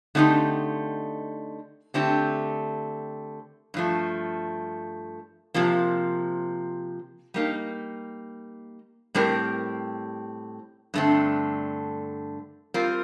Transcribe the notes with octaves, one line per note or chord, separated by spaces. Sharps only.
D3 A3 C4 D#4 G4
D3 A3 C4 G4
G2 F3 A3
C3 F3 A#3
G3 A#3 D#4
A2 G3 C4 G4 A#4
G2 D3 A3 C4
G3 C4 F4 A#4